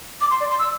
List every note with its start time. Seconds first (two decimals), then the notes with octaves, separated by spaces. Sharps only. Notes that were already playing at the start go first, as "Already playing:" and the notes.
0.21 D6
0.30 C6
0.40 D5
0.50 C6
0.59 E6